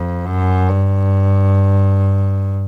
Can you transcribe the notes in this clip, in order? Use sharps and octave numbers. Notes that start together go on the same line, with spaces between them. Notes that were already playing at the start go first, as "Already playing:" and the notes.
Already playing: F2
F#2
G2